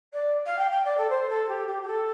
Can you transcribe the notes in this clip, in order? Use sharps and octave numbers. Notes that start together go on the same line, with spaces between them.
D5
F5
G5
G5
D5
A4
C5
A4
G4
G4
G4
A4